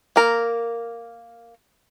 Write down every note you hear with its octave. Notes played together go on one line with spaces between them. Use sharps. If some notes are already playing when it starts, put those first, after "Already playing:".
A#3 A#4